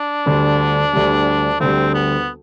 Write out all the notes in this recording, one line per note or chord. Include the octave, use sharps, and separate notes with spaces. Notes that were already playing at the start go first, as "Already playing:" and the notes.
Already playing: D4
D2 D3 G3
D2 D3 G3
D2 D3 G3 C4
B3